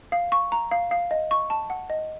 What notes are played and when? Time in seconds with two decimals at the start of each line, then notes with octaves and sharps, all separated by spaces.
0.12 F5
0.32 C#6
0.52 A#5
0.71 F5
0.91 F5
1.11 D#5
1.31 C#6
1.50 A5
1.70 F#5
1.90 D#5